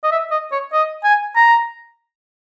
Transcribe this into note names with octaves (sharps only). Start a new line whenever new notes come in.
D#5
E5
D#5
C#5
D#5
G#5
A#5